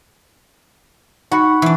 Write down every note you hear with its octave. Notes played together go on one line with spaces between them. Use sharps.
D#4 F#4 F#5 B5 C#7
E3 D4 C#6